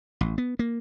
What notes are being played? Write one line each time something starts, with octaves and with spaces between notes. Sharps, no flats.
A1
B3
A#3